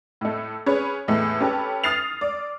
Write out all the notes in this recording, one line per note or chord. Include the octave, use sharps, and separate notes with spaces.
A2 A3
C#4 G#4 B4 C#5
E2 A2 A3
C#4 G4 A4 B4
D#6 F6 A6 C7 F7
D5